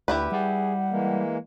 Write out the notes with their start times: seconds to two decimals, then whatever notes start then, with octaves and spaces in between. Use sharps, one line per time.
0.08 D2 E4 G4 B4
0.32 G3 G#4 F#5
0.91 E3 G#3 A#3